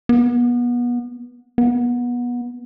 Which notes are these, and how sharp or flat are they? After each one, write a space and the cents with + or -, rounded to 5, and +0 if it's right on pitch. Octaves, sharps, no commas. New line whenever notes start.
B3 -30
B3 -25